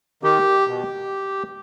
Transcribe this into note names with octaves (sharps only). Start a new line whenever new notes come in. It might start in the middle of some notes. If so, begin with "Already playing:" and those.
D#3 G4
B2